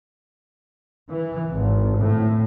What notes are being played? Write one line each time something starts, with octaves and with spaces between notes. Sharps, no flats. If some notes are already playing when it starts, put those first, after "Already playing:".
E3
G#1
A2